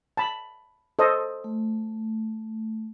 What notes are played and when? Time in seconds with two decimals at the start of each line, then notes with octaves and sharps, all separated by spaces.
0.17 A5 B5
0.99 A4 C5 D#5
1.44 A3